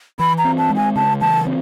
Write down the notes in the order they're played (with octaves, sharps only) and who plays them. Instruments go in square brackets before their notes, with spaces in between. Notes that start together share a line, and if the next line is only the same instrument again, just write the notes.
[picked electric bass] E3 [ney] B5
[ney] A#5
[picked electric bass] C4
[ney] A5
[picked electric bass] G#3
[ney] G#5
[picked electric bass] C#3 [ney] A5
[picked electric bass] E3 [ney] A5
[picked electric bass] C4